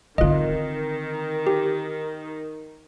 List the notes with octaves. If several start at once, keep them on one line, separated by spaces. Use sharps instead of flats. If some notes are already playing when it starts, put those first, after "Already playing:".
D3 D#3 C4 F4 D#5
G4